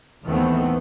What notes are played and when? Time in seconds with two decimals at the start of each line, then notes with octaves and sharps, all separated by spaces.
0.24 D#2 D#3 E3 A3 B3 C4